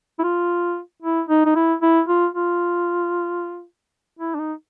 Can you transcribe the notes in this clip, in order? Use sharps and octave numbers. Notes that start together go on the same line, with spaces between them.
E4
F4
E4
D#4
D#4
E4
E4
F4
F4
E4
D4
D#4